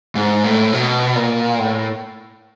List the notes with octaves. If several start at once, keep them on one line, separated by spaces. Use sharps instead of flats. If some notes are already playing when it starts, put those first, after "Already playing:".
G#2
A2
B2
A#2
A2